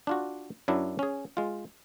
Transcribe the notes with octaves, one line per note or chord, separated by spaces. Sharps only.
D4 F4 F#4
F#2 F#3 D4 E4
C#4 G#4
G#3 F4